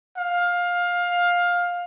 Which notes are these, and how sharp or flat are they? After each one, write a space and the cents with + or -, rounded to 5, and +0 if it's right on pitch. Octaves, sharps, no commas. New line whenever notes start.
F5 +15